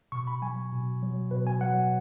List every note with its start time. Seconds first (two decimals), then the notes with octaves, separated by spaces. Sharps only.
0.12 B2 C#6
0.27 B5
0.42 F#3 G#5
0.72 B2
1.02 F#3
1.31 B2 B4
1.47 G#5
1.61 F#3 F#5